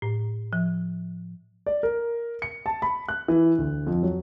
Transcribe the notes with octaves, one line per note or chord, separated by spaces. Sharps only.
A2
F3
D5
A#4
C#7
A5
B5
F#6
E3
D2
F2
F#3